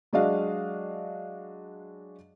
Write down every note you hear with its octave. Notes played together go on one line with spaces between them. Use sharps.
F#3 G#3 D4 F#4 D#5 F5